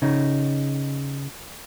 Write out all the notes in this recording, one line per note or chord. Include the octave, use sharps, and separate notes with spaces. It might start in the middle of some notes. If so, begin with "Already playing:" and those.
C#3 D#4